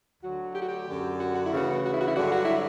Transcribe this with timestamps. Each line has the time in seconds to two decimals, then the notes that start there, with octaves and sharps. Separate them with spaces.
0.22 D2 D3 F#3 F#4
0.54 G4
0.61 F#4
0.69 G4
0.87 F#2 D3 F#3
1.19 F#4
1.35 F#4
1.45 E4
1.52 D2 C#3 E3 F#4
1.85 F#4
1.92 E4
2.00 F#4
2.08 E4
2.16 G2 D3 F#3 F#4
2.32 F#4
2.45 E4